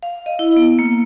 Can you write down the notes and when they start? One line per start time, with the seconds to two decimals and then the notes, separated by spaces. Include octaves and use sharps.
0.03 F5
0.26 D#5
0.39 E4
0.57 B3
0.79 A#3